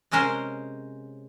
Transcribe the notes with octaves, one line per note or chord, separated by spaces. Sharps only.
C3 G#3 C#4 A#4 C5